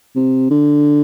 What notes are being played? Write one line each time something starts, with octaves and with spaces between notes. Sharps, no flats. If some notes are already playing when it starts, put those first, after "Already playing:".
C3
D3